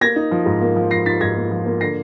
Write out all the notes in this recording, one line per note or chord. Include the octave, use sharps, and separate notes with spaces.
A#3 G#6 A#6
D#4
F3
G#2
A#3
F3
F3 A#6 C7
D#4 A6 B6
G#2 G#6 A#6
A#3
F3
A#3
D3 A#6 C7